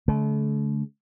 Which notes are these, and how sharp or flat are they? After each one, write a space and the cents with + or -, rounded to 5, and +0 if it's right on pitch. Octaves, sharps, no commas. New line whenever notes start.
D3 -45 A3 -40